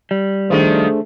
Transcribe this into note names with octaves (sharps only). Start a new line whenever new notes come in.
G3
D#3 F3 A3 D4 G#4 C5